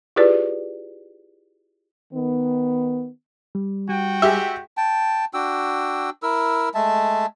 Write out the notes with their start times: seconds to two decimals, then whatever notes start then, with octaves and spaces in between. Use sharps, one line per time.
0.16 E4 F4 G4 G#4 B4 D5
2.12 D#3 B3
3.55 G3
3.89 G3 F#4 G5
4.22 G#3 G4 E5
4.77 G5 A5
5.34 D4 F#4 G5 E6
6.23 E4 A#4 E6
6.75 G#3 A3 E5 A5